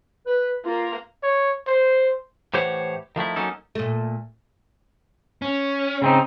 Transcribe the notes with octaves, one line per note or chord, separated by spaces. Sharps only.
B4
A#3 F4 A#4
C#5
C5
A2 E3 G4 C5 C#5 F#5
D#3 F3 A3 E4
F#3 A#3 C#4 D#4 A4
A#2 A3
C#4
C#3 C4 D#4